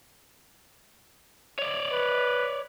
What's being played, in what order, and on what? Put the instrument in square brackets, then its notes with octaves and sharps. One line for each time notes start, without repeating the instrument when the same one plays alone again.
[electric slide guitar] C#5 D5
[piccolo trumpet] B4